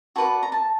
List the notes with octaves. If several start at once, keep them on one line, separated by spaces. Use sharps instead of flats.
F#4 B4 D5 A5
A#5
A5